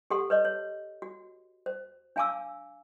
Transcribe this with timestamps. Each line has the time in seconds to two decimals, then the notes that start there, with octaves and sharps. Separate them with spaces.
0.10 G4 A4 F#5 C6
0.30 B4 C#5 D#5
0.45 C#5
1.02 F#4
1.66 C5
2.16 D4 F5 G#5 A5 D6 E6